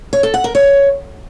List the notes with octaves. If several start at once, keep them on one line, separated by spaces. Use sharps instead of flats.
C#5
A4
F#5
A#4
C#5